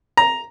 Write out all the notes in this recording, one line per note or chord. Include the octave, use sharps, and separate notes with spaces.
A#5